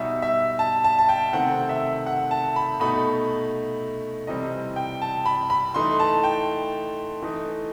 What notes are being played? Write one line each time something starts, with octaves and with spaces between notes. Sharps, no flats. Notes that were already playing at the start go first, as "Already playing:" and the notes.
Already playing: B2 G3 D#4 E5
E5
A5
A5
A5
G5
C3 D#3 A3 C4 F#5
E5
F#5
A5
B5
B2 A3 D#4 B5
C3 E3 G3 C4 D#5
G5
A5
B5
B5
E3 A3 D#4 C6
A5
G5
E3 A3 D#4